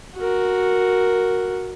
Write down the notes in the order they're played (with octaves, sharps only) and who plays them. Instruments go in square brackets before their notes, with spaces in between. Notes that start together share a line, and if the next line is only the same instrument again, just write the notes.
[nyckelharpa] F#4 A#4